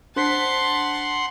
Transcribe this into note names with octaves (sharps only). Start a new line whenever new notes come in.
D4 C5 F#5 A5 C6 B6 C7